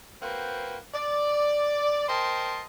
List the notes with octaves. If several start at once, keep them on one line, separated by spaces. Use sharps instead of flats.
A#3 C4 F#4 B4 C5 G5
D5
A#4 C5 D#5 G5 A5 C6